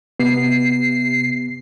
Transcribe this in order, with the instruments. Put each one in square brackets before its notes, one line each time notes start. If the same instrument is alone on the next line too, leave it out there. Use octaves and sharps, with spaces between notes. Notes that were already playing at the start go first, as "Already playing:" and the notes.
[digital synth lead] C3 [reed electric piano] B3 [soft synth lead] C7